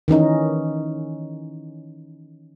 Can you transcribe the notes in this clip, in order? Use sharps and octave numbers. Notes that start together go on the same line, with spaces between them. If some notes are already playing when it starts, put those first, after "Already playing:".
D#3 E3 C#4 D#4